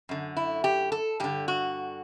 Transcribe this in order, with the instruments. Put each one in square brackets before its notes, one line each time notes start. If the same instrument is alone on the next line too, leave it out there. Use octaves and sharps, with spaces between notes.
[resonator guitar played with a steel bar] F#2 D3
E4
G4
A4
G2 D3 G4
F#4